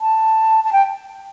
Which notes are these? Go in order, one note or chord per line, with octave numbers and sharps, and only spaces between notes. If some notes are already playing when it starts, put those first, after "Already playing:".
A5
A5
G5